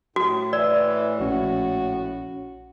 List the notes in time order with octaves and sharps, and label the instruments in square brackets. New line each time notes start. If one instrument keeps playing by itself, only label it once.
[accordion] A2 [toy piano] F#4
[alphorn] E3 [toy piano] D5 [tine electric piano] E6
[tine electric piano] A#1 C#4 [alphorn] F#4